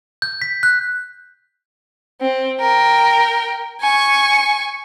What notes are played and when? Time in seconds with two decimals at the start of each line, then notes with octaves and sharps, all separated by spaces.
0.22 G6
0.42 B6
0.63 F#6
2.21 C4
2.60 A#4 G5
3.81 G#5 C#6